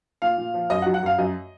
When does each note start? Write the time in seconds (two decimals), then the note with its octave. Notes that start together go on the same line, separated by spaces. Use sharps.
0.22 A#2 F5
0.38 A#2
0.54 F3
0.70 F#2 D#5
0.82 F#5
0.86 F#3
0.94 F#5
1.03 F#2 F5
1.18 F#2 D#5